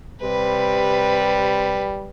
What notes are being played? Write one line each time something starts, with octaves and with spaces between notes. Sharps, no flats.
C3 G3 B4